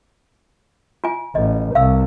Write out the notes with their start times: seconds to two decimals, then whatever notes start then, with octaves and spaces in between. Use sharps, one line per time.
1.04 F4 G#5
1.35 A1 D#5
1.75 C2 F5 E6